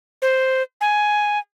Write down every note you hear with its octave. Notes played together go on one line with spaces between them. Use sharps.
C5
G#5